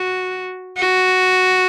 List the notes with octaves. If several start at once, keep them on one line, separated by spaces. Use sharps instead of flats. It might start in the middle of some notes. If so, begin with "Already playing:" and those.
Already playing: F#4
F#4